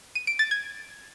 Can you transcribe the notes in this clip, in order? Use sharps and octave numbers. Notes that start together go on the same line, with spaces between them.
D#7
D7
A6
G#6